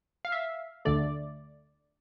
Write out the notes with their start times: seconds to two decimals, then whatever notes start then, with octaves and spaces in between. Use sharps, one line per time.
0.25 F5
0.32 E5
0.85 D2 D3 A3 D5